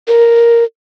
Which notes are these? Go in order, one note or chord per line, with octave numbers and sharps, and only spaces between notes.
A#4